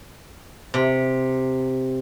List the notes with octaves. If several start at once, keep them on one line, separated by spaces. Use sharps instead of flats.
C3